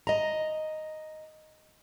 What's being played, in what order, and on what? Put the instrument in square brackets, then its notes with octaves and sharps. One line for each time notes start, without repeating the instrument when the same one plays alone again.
[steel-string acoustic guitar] D#5 A#5